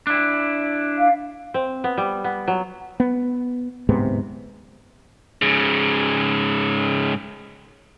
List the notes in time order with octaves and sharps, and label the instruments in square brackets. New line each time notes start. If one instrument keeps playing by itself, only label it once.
[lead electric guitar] D4 E4
[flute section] F5
[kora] C4
B3
G3
B3
F#3
[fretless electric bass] B3
D1 G#2 C3 B3
[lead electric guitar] G#2 C#3